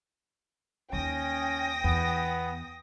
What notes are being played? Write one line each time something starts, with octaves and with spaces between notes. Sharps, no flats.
D#2 C#3 C#4 G5 D#6 A#6
E2 B3